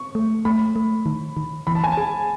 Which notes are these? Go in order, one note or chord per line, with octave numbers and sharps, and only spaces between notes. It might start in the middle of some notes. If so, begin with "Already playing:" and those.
Already playing: C#6
A3
A3 B5
A3
D#3
D#3
E3 B5
A5
G#5
A5
G#4